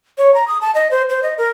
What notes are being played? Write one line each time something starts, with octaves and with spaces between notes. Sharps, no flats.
C#5
A#5
D#6
A5
D#5
C5
C5
D#5
A#4